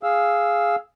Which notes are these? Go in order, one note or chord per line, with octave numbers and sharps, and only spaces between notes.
G#4 F5 E6